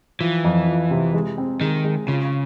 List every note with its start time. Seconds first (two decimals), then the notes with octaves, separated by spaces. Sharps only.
0.20 E3 F3
0.44 F2
0.67 F3
0.91 C3
1.13 G#3
1.38 C4
1.60 D#3 G#3
1.84 G#3
2.08 C#3 F4